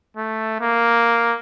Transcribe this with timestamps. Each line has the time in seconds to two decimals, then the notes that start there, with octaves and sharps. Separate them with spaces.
0.17 A3
0.61 A#3